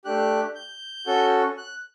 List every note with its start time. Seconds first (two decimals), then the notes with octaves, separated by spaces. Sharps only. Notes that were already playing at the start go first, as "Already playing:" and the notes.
0.05 A3 D4 G4 F#6
0.55 G6
1.06 C#4 F#4 A4
1.58 F#6